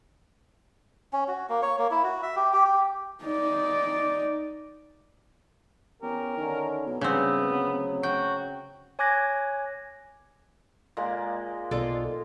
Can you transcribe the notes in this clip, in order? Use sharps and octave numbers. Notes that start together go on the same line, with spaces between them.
C#4
F#4
A#3
C#5
A#3
E4
F#4
E5
G4
G4
G4
D#4 D5
E2 C#4 G4 A#4
D3 D#3 C#4
B2 E3 F#3
G2 C#3 B3 C4
D1 F#3
F#4 G5
C#5 G#5 D6 F#6 G#6 A#6
A#2 G#3 A#3
B1 F4 A4 D5